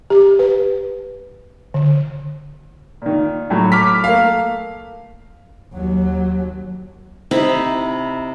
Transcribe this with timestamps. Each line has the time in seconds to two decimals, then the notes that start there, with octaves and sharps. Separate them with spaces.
0.10 G4
0.39 B4
1.74 D3
3.02 A#2 D#3
3.50 A2 F#3
3.72 D6 F6 B6
4.04 A3 A#3 F5
5.74 D#2 F#3
7.31 C3 D#4 E4 B5